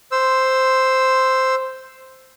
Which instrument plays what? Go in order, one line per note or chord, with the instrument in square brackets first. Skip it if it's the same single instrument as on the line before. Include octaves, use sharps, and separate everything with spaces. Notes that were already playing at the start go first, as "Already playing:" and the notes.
[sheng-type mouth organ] C5 E6